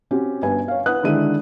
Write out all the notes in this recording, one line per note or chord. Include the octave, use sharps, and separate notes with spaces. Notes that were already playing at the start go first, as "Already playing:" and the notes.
C4 C#4 F#4 G4
G1 G2 B4 G#5
C#5 F5
B4 F#5 D#6 F#6
D3 D#3 G#3 E4 D#7